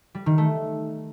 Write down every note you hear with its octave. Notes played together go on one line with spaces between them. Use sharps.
G3
D#3
A3